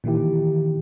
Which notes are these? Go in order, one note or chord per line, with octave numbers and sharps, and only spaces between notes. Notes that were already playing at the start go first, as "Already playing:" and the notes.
A#2 D#3 E3 E4 G4